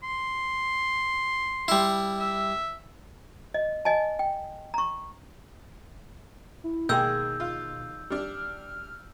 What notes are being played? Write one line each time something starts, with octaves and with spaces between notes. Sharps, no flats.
C6
G3 E4
E5
D#5
D#5 G#5 A5
G5
A#5 C#6
E4
B2 D#3 G#3 A#3 G#4 E6 G6
F4
G3 D4 F6